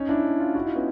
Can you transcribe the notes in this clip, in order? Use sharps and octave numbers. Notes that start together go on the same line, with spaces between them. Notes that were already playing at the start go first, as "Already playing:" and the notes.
Already playing: C#4 D#4
D4 E4
D#4 F4
E4 F#4
D#4 F4
B3 C#4